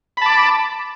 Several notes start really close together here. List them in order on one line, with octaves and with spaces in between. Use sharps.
B5 A5 D6